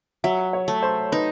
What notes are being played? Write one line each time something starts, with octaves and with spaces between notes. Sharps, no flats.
F#3 E5
C#5
A3
C5
D#4 B4